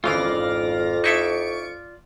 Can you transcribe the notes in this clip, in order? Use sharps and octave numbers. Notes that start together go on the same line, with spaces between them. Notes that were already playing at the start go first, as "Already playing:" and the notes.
G#1 F2 C#3 E3 F4 D5 F5 A#6
D#4 E4 A4 C#6 D7